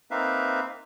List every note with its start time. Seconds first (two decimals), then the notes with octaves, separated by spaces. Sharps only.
0.11 A#3 C4 D#4 B4 E5 F5